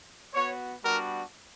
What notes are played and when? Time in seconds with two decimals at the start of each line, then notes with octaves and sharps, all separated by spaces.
0.34 B3 F#4 C#5
0.83 G3 B3 D4 F#4 A#4